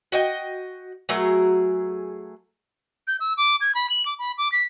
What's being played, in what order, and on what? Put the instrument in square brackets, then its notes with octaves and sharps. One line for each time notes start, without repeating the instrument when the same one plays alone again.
[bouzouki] F#4 D#5 G5
F#3 A3 G#4 A#4
[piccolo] G6
E6
D6
G#6
B5
F#7
D6
B5
D6
B6